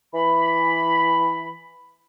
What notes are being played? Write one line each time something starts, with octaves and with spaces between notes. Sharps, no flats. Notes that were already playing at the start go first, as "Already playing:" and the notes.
E3 B5